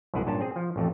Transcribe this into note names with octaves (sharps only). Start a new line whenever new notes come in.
C2 F#2 A#2 E4 G#4 F#5
G2 A#2 C#4 A5
C4 G#4
F3
A1 F2 A3